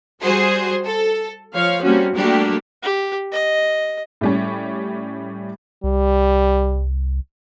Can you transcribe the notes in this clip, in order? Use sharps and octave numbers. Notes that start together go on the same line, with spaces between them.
G3 F#4 G#4 C5
A4
F3 C#5 F5
G3 A#3 C4 C#4 F#4
G3 A3 A#3 D4 F#4 G4
G4
D#5
A2 G3 C#4
C2 G3